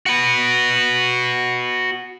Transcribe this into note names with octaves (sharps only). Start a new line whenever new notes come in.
F#4 B4